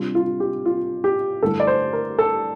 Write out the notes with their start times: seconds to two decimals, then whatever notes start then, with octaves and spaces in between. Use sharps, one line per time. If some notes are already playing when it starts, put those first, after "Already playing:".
Already playing: C3 G3 D4 F4
0.15 F4
0.40 G4
0.65 F4
1.04 G4
1.42 G2 D3 A3 E4 A4
1.60 D5
1.67 C5
1.93 A#4
2.19 A4